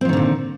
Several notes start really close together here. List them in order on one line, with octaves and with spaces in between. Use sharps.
C4 F3 D#3 D3 A#2